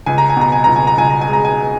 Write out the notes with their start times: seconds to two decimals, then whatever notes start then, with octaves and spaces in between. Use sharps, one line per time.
0.06 C#2 G#5
0.18 A#5
0.30 G#5
0.37 B2 A#5
0.52 G#5
0.64 C#2 A#5
0.76 G#5
0.87 A#5
0.97 C#2 G#5
1.10 A#5
1.21 G#5
1.28 G#3
1.33 A#5
1.45 G#5